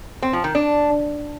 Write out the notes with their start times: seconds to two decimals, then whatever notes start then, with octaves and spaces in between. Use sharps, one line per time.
0.22 C4
0.33 F3
0.44 D#3
0.55 D4